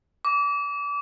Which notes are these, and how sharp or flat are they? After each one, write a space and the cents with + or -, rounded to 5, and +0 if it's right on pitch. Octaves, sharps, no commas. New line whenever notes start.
D6 -30